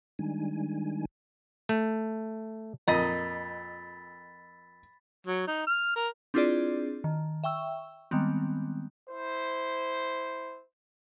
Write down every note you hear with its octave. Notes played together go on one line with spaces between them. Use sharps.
D#3 G3 G#3 D4 D#4 G#5
A3
F2 A#2 D#5 A#5 B5 A6 B6
F#3
D#4
F6
A#4
C4 D4 E4 F4 G#4 D5
D#3
E5 G5 C#6 E6
D#3 G3 G#3 B3 C4
E4 C5